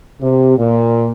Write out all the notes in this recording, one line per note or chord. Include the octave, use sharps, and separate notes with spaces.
C3
A#2